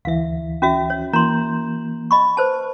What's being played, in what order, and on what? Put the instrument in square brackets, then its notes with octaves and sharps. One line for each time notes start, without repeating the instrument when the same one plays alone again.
[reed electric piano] D2 E3 [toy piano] E5 F5
[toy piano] C#4 F#4 E5
C#5
[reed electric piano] E3 A#3 G6 [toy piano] A#5 C6
[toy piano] D#5 B5 C#6
B4 C5 A5